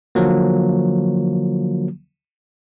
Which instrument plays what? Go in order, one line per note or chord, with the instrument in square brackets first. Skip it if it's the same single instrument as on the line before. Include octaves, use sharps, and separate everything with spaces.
[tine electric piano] D3 F3 F#3 A#3